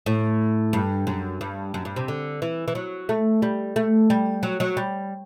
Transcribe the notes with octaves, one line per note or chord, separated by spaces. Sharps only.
A2
G2
F#2
G2
F#2
G2
C3
D3
E3
E3
F#3
A3
G3
A3
G3
F#3
F#3
G3